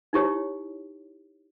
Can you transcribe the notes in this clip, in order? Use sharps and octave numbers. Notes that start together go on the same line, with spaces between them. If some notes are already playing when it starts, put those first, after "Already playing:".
D#4 E4 G4 C#5